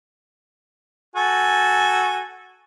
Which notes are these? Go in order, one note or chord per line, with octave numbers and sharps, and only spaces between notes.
F#4 A4 G#5